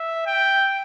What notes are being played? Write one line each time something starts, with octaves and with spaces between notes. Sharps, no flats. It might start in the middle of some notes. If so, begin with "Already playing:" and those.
Already playing: E5
G5